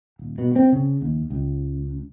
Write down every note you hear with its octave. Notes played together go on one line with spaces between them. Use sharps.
D#1
B2
C4
C#3
D#2
C#2